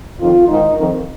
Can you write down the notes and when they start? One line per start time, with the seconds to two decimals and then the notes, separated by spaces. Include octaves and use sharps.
0.20 F2 D#3 F4
0.48 G#2 D#3 D#4
0.76 F2 D#3